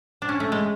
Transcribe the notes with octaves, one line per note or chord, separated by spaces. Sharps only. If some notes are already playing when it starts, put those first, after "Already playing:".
D4
C#4
A3
G#3